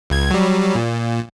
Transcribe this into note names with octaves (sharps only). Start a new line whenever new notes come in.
C#2 G#6
F#3 G3
A#2